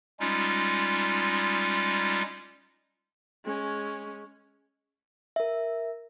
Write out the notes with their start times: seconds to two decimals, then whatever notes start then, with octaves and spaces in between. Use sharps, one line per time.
0.20 G3 G#3 C#4 D#4 F4
3.44 G#3 C#4
5.36 A#4 E5